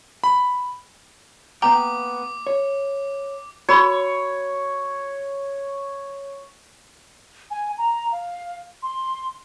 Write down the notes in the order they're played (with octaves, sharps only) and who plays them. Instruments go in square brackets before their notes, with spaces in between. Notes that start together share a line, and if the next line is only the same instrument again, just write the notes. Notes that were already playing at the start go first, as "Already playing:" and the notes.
[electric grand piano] B5
[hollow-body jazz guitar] A#3 B3 G5 [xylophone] A#5 [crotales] D6
[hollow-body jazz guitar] C#5
[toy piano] F#4 A#4 B5 [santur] C#5
[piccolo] G#5
A#5
F5
C6